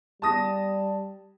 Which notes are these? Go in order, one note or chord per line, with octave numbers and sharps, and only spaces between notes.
G3 A5 D#6 A#6